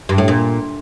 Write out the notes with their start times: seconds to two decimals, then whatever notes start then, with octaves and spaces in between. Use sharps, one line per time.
0.09 G2
0.18 A2
0.28 A#2